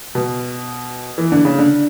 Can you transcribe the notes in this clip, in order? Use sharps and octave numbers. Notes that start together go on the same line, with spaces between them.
B2
E3
D3
C#3
D3